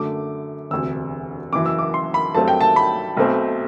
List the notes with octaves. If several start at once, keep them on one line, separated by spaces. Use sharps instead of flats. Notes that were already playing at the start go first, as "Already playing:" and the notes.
Already playing: F#2 D3 A3 D6
E1 D2 C3 E6
F#1 F#2 E3 D6
E6
D6
C6
B5
G2 F#3 A3 C4 A5
G5
A5
B5
B1 B2 A3 C4